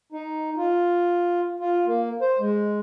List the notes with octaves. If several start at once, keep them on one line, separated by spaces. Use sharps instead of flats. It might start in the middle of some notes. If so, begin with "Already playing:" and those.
D#4
F4
F4
A#3
C5
G#3